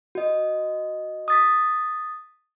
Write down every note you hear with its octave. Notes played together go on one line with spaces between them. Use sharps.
F#4 D#5
D#6 A6 B6